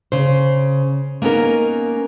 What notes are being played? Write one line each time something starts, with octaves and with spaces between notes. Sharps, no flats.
C#3 C5
A#3 B3 C#4 D#4 A#4